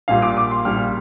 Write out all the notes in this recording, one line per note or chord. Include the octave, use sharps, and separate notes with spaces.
A#1 A#2 G3 F5
D6
D6
C6
A#1 A#2 G3 F6